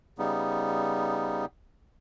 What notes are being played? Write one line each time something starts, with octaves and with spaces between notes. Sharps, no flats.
C#3 G3 B3 D#4